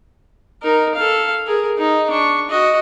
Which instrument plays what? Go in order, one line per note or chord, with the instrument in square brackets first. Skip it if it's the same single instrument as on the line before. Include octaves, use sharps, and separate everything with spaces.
[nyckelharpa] D#4 A#4
A4 F5
G#4 A#4
D#4
D4 C#6
F#4 D#5